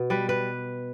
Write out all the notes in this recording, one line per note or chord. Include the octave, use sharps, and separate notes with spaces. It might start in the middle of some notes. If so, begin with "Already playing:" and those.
Already playing: B2
G3 B4
B4